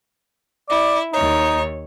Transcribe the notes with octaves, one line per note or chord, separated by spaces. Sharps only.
E4 D5
D#2 D#4 C#5